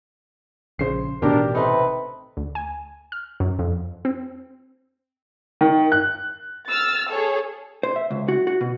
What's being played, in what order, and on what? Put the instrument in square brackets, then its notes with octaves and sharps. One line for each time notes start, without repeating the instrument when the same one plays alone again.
[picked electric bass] A#1 C#3 [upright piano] C5 C7
[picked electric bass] A1 B2 D#3 [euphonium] D4 [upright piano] G4 D5 D6 [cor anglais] A#4
[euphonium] C3 [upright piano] D#4 A4 C6 [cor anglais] B4
[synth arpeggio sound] D2
G#5
F6
F#2
F2
C4
[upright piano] D#3
F#6
[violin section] E6 F6 A6
G#4 A4 C#5
[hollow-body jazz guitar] C5
E5
C#2
F#4
F#4
B2